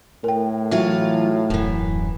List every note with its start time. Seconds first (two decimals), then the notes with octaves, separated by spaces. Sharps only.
0.24 A2 A#4 G5
0.71 E3 F#3 F4 E5
1.50 D#1 F#2 E3